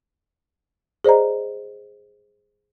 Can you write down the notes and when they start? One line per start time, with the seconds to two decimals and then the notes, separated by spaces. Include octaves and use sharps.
1.05 G#4 C5 D5 D#5 A#5